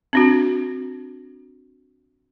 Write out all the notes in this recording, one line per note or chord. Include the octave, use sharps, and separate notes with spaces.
C4 D4 F#4